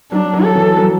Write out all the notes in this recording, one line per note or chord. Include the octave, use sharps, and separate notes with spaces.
F#3 D4
F#3
A4
E3
F#3